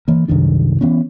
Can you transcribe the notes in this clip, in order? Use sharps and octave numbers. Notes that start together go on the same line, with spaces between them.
E3 A#3
C2 F#2 D#3 D4
E3 B3 C#4